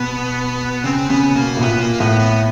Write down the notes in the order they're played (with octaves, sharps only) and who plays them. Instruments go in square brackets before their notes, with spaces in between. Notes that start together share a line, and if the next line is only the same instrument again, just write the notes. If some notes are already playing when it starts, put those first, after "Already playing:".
Already playing: [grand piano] B2 [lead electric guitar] B3
[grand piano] C#3 [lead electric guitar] C4
[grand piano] C#3 [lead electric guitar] B3
[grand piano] B2 [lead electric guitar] A#3
[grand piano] A2
[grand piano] A#2 [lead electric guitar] B3
[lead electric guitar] A#3
[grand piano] A2 [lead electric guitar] B3
[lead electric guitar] B3